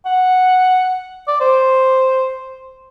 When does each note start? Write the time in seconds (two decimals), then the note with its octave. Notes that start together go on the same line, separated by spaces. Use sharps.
0.06 F#5
1.28 D5
1.41 C5